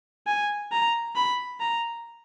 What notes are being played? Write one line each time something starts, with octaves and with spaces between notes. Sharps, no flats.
G#5
A#5
B5
A#5